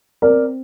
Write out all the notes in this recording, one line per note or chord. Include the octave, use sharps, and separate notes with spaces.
C4 A#4 D5